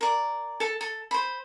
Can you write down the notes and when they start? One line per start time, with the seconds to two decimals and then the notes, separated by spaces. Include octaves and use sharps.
0.01 A#4 D5
0.60 A4 A5
0.81 A4
1.11 C5 B5